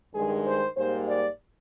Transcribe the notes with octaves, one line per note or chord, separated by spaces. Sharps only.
G2 D#3 G#3 G#4
C5
G#2 G3 A#3 C5
D5